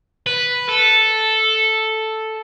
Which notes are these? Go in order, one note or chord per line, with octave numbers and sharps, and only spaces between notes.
B4
A4